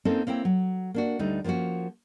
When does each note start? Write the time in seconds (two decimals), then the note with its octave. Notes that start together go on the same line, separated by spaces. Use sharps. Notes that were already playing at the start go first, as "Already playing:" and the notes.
0.05 A#3 C4 C#4 D#4 A4
0.27 A#3 C4 E4 C#5 G5
0.45 F#3
0.94 A#3 D4 F#4
1.19 D2 G3 A3 D#4
1.44 F3 A#3 B3 C#4 F#4